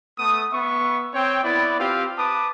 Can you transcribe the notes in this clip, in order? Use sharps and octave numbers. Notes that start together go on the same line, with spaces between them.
A3 B3 D#6
B3 E5 C#6
C4 C#5 G5
B3 E4 D5
C4 F4 G4 F5
B4 A5 D6 D#6